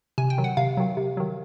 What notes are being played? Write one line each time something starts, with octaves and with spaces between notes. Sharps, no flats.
C3 G#5
G5
D#3 F#3
F#5
C3 F5
D#3 F#3
C3
D#3 F#3